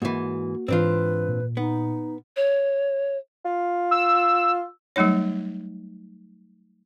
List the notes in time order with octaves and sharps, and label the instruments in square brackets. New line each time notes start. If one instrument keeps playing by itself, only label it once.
[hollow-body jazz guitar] G#2 E3 [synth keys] A#3 F#4
[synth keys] G#2 E3 [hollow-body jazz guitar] C4 D4 F4 [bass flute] B4
[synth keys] A#2
[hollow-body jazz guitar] B3 [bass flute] D#4
[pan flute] C#5
[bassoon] F4
[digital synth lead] E6
[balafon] F#3 G3 A3 D#4 C#5